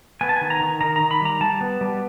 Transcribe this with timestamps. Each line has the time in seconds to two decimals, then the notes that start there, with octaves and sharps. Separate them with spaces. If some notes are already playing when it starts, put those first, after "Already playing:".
0.21 B3 G#5
0.29 A5
0.36 D#3 G#5
0.50 A#5
0.61 D#3
0.81 D#3 A#5
0.96 D#3 A#5
1.11 B5
1.21 G3 A#5
1.41 G3 A5
1.61 B3
1.81 G3